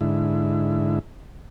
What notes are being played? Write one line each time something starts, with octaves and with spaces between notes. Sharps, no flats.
G#2 D3 E4